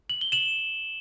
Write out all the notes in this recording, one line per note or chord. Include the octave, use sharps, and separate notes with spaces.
F#7
G7
E7 F#7